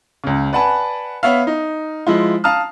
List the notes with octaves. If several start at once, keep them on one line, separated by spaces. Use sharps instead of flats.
C#2 C#3
B4 D5 F#5 G#5 A5 B5
B3 C#5 E5 F5
D#4
F3 G#3 E4 F4
F5 A5 A#5 D#6 F6